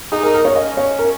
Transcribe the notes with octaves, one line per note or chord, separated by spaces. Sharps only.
D#4 G#4
A#4
A#4
C#5
C#4 D#5
C#5
A#4